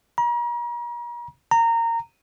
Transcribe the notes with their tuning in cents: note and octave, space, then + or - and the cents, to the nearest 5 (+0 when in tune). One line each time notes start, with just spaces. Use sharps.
A#5 +40
A#5 -20